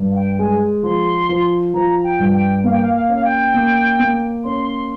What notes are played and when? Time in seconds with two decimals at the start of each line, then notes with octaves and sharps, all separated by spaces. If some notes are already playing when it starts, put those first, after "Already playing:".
Already playing: G2
0.11 F5
0.16 G5
0.39 G#3 G#5
0.83 F3 C6
1.29 F3
1.74 F3 A#5
2.04 G5
2.19 G2
2.34 G5
2.64 A#3 F5
2.73 G5
2.82 F5
2.94 F5
3.09 C#4
3.14 F5
3.25 G5
3.54 A#3
4.00 A#3
4.44 C#4 C6